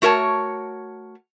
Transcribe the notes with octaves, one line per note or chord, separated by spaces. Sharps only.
A3 F#4 A#4 C#5 A5